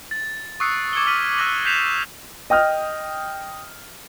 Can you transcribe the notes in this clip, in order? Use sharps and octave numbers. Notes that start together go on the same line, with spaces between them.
A6
C#6 D#6 E6 F#6 C7 C#7
D6 G#6 C#7 F#7 G7
D6 D#6 F6 B6 D#7 F#7
D6 E6 F#6 A#6 F#7
F#6 G6 B6 C7 E7 F7
D#5 G5 D#6 F6